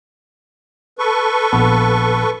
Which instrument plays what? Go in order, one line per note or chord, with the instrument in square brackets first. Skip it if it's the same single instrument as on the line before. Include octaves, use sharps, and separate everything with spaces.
[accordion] A4 B4 C#6
[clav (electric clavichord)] A#1 B3